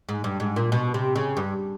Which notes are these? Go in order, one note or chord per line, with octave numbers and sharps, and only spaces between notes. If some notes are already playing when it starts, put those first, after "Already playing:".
G#2
G2
G#2
A#2
B2
C3
C#3
G2